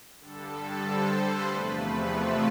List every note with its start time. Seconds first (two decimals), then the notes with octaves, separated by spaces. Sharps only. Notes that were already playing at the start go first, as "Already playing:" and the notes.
0.20 G2 D3 G3 A4
0.83 C5
1.14 B4
1.45 E2 C3 F3 A3 B4
1.77 B4
2.09 A4